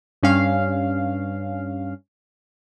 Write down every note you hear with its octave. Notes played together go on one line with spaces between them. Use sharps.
G2 C#4 F5